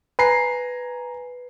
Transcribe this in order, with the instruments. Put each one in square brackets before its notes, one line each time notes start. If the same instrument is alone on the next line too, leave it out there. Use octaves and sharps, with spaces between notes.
[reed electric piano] B4 [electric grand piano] G#5 A#5 C7